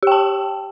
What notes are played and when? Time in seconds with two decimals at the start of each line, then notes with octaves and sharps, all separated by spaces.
0.03 G4
0.07 G5
0.12 A5